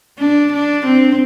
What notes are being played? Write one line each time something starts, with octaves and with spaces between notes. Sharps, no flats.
D4
D4
C4